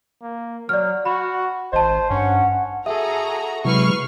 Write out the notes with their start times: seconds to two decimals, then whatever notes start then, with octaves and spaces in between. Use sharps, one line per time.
0.22 A#3
0.69 F#3 D5 F6
1.05 F#4 B5
1.73 G#1 C5 D#5 A5
2.10 G2 C#4 F#5
2.86 F#4 G#4 A4 E5 A#5 D#6
3.65 C3 F#3 G#3 E4 B4 C#6 F6 C7